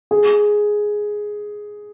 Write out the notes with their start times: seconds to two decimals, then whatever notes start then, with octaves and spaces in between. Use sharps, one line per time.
0.11 G#4